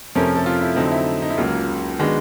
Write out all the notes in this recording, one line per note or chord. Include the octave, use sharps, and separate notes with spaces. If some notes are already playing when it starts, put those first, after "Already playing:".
F2 C3 F3 A3 C#4 A#4
A4
F4
E4
F2 D3 F#3 A3 C4 D#4
E4
D#4
E4
C#2 C#3 F#3 A#3 F4
D#3 G#3 B3 D4 F#4